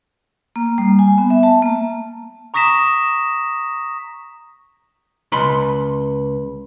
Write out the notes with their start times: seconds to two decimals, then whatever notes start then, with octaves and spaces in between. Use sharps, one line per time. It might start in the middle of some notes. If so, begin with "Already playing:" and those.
0.56 A#3
0.78 G3
0.99 G#5
1.18 B3
1.30 E5
1.43 A5
1.62 A#3
2.54 A#5 C#6 D#6 A#6 B6 E7
5.32 C#2 B5 C6